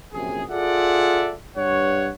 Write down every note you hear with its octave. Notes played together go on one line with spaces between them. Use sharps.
A#1 F#2 C3 G#4
F4 G#4 A4 D5 E5 F#5
G2 C#5 F#5